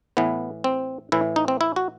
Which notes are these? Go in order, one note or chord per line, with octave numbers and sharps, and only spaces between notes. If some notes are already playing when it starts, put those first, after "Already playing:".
A2 E3 B3
C4
A2 E3 E4
D#4
C4
E4
F#4